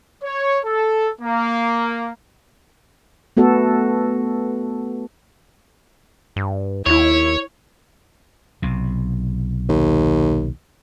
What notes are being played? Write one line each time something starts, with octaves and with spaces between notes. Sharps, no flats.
C#5
A4
A#3
A3 B3 F#4 A4
G2
D#2 E4 C#5
B1 C3
D#2